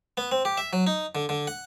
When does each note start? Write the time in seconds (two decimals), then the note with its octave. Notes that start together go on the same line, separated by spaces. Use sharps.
0.17 B3
0.32 C4
0.45 G4
0.57 E5
0.73 F#3
0.87 D#4
1.15 D3
1.29 D3
1.47 F#5